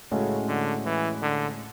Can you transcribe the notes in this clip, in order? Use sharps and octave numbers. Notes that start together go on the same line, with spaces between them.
A2 C#3 G#3 C#4 F#4 A4
D3
E3
D3